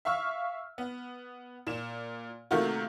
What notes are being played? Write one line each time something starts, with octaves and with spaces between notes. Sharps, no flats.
E5 F5 C#6 E6 F6
B3
A#2 E7
C3 D#3 A3 A#3 F4 F#4